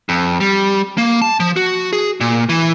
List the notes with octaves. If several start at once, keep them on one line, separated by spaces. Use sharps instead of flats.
F2
G3
A#3
A5
F3
F#4
G#4
A#2
E3